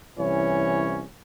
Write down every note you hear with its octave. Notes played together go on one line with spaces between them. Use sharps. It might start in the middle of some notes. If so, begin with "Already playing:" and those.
C2 E3 C#4 C#5